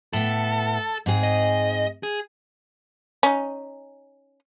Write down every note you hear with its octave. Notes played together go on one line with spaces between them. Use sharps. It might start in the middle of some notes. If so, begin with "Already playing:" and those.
A2 B3 A4
G#2 C4 G#4
D#5
G#4
C#4 D#4